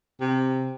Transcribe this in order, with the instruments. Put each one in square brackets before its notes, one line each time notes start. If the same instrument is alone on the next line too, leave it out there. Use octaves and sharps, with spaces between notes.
[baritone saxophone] C3